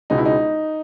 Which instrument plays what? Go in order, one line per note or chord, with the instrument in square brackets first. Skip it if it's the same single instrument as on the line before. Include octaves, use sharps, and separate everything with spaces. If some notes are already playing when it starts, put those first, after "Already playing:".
[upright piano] C#2 B2 G#3 D#4
E4
D#4